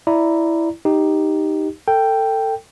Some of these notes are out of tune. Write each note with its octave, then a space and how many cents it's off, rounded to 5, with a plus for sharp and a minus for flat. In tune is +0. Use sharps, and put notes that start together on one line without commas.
E4 +0 D5 +0 A#5 +0
D#4 +0 G4 +0
A4 +25 G5 +0